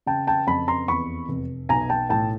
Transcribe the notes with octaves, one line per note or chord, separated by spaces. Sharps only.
C#3 G5 A5
G5 A5
F2 A5 B5
A#5 C6
E2 B5 C#6
F1
B1 G#5 A#5
G5 A5
A2 G5 A5